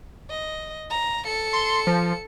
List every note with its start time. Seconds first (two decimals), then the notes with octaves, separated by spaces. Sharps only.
0.30 D#5
0.90 A#5
1.25 A4 C#7
1.53 C6
1.87 F3